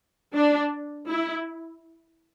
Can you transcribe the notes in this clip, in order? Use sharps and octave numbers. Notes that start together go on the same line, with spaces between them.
D4
E4